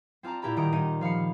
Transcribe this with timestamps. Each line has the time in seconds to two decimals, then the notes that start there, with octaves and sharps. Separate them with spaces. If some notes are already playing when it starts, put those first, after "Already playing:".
0.23 C4 F4 D5 A5 A#5
0.42 A#2 E4 G4 D5 A#5 B5
0.56 D#1 D#3 A#5 D#6 D7
0.72 D#1 D#4 D#7
1.01 F3 F5 B5 C#7